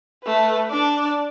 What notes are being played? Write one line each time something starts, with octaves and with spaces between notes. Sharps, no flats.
A3 B4
D4 D5